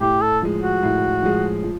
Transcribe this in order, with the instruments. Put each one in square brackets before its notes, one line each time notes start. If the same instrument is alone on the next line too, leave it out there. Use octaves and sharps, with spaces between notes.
[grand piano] A2 [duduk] G4
[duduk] A4
[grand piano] F3 G#3
[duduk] F#4
[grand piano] A2
F3 G#3
F3